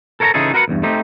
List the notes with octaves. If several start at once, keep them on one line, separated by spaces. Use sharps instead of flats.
A4 A#4 C#5 E5 A5 A#5
C#3 E3 D#4 F4 G#4 A4
F#4 A#4 B4 F5 F#5
B1 E2 G2
A3 C4 D#4 G4